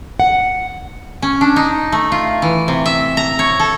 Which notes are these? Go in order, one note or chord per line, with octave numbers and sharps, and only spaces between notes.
F#5
C#4
D4
D#4
A3
F4
E3
C3
E5
A#5
C#5
A4